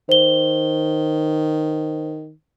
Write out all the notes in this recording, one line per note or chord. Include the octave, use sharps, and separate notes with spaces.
D#3 C5 G7